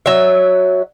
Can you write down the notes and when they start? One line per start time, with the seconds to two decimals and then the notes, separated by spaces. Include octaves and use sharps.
0.06 F#3 E5